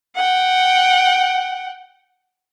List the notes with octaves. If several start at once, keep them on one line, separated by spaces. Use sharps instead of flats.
F#5 G5